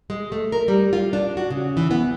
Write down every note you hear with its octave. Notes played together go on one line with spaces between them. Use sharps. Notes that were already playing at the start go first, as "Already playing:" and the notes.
G#3
A3
A#4
G3
F4
D4
F#4
C#3
E3
B3